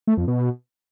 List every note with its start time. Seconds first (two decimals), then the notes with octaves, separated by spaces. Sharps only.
0.07 A3
0.18 F2
0.28 B2